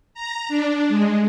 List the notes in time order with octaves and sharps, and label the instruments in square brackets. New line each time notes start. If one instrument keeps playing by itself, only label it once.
[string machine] A#5
D4
G#3